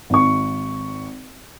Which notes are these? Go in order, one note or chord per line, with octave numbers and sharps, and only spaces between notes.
G#1 C#6